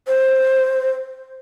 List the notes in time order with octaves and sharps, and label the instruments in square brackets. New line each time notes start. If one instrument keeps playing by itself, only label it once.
[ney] C5